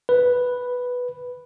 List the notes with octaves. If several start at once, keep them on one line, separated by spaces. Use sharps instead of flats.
B4